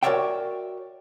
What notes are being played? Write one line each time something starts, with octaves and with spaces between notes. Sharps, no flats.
F#4 A#4 C#5 D5 E5 G5